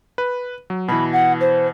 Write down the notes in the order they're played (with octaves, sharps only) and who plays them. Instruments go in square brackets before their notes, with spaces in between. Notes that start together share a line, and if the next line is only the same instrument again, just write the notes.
[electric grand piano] B4
F#3
[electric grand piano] B2 E3 [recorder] B5
[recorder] F#5
C5